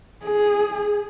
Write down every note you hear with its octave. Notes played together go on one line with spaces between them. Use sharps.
G#4